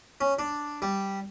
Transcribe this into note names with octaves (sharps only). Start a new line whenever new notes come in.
C#4
D4
G3